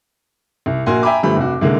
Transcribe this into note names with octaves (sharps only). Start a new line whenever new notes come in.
C2
A#1 A#3 F#4 G#5 C6
E5 G5 G#5 A#5 B5 D6
G1 F3 G3 A3 B5
F1 F#4
C2 D3 G#3 A#3